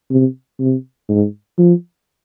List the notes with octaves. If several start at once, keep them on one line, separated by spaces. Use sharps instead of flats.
C3
C3
G#2
F3